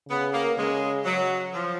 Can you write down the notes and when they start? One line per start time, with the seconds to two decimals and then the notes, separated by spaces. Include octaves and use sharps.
0.08 C#3 B3
0.33 A#3
0.57 C#3 G#3
1.05 F#3
1.53 F3